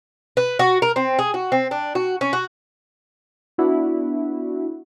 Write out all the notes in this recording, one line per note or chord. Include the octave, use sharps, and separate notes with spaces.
B4
F#4
A#4
C4
G#4
F#4
C4
D4
F#4
C#4
F#4
B3 D4 E4 F#4